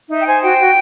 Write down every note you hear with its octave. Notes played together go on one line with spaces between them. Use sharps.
D#4 E5
G5
C5 G#5
F#4 G5
F#4